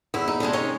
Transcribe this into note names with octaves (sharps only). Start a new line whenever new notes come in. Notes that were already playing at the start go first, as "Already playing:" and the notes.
E2 E4
D#4
C3 D#3 G#3 D4
C#4 D#4